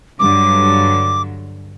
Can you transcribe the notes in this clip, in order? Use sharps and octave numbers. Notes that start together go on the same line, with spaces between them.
G2 D3 F#3 D6